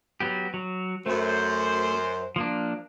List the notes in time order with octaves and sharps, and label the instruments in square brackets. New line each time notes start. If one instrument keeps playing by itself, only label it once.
[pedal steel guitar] F#3 B3 G4
F#3
[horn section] F#2 C5 [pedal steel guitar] A3
[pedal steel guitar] F3 A#3 D4